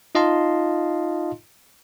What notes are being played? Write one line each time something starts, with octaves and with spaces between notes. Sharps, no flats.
D#4 F4 D#5 F5 A5 C6